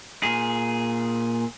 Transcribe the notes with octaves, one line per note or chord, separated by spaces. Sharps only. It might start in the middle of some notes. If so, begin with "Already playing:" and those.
A#2 G#4